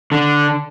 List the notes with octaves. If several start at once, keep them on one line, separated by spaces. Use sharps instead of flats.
D3